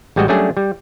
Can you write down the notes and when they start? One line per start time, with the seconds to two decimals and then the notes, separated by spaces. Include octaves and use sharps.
0.16 A1 G3 G#3 F#4 D#5
0.28 F#3 G3 A3 C#4 D4 G#4
0.57 G3